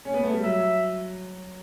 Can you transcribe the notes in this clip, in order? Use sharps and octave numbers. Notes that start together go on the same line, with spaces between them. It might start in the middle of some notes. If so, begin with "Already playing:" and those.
C#4
B3
A3
G3
F#3 E5